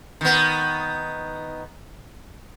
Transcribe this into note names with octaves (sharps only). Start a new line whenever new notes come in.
D#3 B3